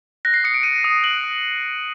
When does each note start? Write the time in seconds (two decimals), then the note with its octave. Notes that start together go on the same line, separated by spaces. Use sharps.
0.25 F#6 A#6
0.34 C7
0.44 D#6 C#7
0.54 D7
0.63 F#6 D#7
0.84 D#6
1.03 F#6 F#7
1.24 D#6